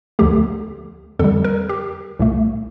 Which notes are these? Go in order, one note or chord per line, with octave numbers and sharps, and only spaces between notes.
D2 D3 F3 A3 G4
F2 D3 G3 A4
A#4
G4
C2 A#2 A3